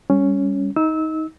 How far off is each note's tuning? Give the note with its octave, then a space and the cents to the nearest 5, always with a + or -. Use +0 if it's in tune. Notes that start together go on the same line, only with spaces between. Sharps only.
G3 +20 C#4 +0
D#4 +20 E6 -25